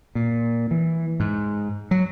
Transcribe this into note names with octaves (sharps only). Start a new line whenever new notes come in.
A#2
E3
G#2
F#3